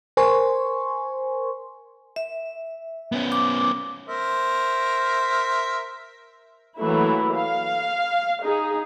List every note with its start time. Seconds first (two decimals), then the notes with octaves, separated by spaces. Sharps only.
0.17 A#4 C5 G#5 C6 C#6
2.16 E5
3.12 B3 C#4
3.32 D6
4.08 A#4 C5 E5
6.79 E3 F#3 A3 A#3 E4
7.36 F5
8.43 D#4 G#4